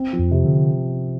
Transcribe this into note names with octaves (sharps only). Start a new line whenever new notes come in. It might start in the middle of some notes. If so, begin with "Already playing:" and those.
Already playing: C4
F3
F2
C3
D3